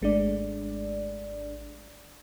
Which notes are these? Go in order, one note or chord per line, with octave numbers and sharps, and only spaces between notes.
G#1 G#3 A3 D4 D5